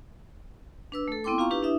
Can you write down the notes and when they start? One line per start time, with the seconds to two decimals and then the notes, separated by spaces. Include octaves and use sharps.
0.92 D4 B4 E6
1.08 A3 A4
1.24 B3 C4 E4 G5 C6 D6
1.38 F4 F5 A#5 C#6
1.51 D4 E4 G4 B4
1.63 D4 E4 E5 D#6